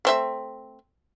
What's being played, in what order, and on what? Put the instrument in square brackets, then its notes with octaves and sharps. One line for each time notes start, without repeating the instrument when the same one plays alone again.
[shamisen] A3 C4 E5